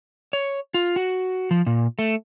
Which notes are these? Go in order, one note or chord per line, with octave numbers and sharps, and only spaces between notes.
C#5
F4
F#4
F3
A#2
A3